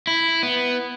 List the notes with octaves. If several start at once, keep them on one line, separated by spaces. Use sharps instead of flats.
E4
B3